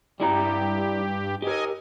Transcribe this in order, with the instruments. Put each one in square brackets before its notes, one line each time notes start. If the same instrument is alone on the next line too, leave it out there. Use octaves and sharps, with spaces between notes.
[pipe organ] G2 G4 [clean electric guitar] G3 E4 A#5
[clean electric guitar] G4 A#4 [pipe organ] D#5 G#5